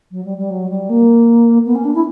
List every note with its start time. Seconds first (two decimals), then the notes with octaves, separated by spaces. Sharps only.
0.11 F#3
0.24 G3
0.37 G3
0.50 F#3
0.69 G3
0.89 A#3
1.65 B3
1.75 C#4
1.84 D4
1.95 E4